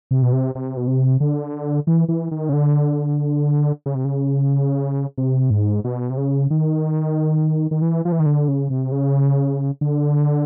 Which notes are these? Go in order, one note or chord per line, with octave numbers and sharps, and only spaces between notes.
C3
B2
C3
C3
B2
C3
D3
E3
E3
D#3
C#3
D3
C#3
C3
C#3
C3
G#2
B2
C3
C#3
D#3
D#3
E3
F3
E3
D#3
D3
C#3
C3
C#3
D3